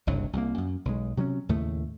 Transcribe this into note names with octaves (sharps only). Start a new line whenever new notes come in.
F#1 C2 G2 F#3
C2 A#3
F#2
B1 G#3
C3 F#3 G3 C#4
D#2 A2 C#3 A3